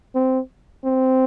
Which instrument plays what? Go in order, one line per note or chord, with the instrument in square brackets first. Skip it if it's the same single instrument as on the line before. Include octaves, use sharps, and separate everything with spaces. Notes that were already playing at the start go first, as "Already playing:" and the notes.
[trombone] C4
C4